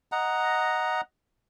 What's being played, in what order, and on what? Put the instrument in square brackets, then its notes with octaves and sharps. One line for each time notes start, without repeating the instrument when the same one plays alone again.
[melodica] D#5 F#5 A#5